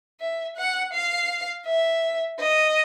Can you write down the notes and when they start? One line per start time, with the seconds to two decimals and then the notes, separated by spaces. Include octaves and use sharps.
0.20 E5
0.57 F#5
0.93 F5
1.66 E5
2.40 D#5